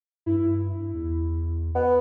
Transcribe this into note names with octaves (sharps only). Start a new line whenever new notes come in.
G2 E4
E2
B3